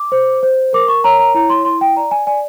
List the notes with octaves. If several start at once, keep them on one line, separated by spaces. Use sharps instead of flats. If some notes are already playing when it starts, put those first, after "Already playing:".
Already playing: D6
C5
C5
A#4 D6
C#6
C#5 A#5
A#5
E4 A#5
C6
E4 C6
G5
D5 A#5
G#5
D5 G#5